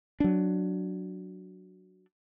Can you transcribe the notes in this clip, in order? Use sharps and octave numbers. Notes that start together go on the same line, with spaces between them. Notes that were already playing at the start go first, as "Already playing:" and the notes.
F#3 D4